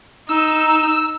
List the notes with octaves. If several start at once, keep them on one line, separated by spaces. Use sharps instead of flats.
D#4 E6